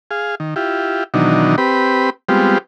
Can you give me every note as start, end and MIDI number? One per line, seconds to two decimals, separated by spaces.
0.11 0.35 68
0.11 0.35 77
0.40 0.54 51
0.56 1.04 64
0.56 1.04 65
0.56 1.04 67
1.14 1.56 47
1.14 1.56 51
1.14 1.56 52
1.14 1.56 54
1.14 1.56 62
1.14 1.56 63
1.58 2.10 60
1.58 2.10 67
1.58 2.10 71
1.58 2.10 83
2.29 2.58 55
2.29 2.58 56
2.29 2.58 59
2.29 2.58 60
2.29 2.58 65
2.29 2.58 67